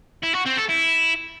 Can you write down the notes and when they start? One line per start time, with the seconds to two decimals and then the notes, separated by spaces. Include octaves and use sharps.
0.23 E4
0.35 F#4
0.46 C4
0.58 A4
0.69 E4